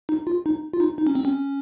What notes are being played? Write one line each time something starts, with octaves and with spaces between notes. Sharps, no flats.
D#4
F4
D#4
F4
D#4
D#4
C#4
C4
C#4